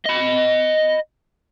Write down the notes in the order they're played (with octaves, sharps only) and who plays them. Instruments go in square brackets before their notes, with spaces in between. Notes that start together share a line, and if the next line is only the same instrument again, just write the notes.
[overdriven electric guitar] D#5 B5